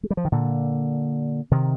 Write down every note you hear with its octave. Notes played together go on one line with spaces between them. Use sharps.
G#3
G3
F3
D#3
A#2 D3
C3 D#3